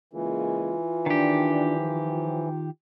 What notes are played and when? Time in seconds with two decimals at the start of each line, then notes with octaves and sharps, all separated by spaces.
0.13 C#3 E3 G#3 A#3 F4
1.06 D#3 D4 G4
1.77 F3